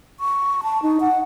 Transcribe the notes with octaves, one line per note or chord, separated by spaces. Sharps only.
C#6
A5
D#4
F#5